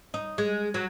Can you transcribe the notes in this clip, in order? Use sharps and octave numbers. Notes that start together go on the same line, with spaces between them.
D#4
G#3
F#3